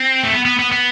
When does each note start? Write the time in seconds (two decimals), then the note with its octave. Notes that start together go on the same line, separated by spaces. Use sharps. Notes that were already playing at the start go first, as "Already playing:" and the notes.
Already playing: C4
0.23 A3
0.32 B3
0.45 B3
0.59 B3
0.72 B3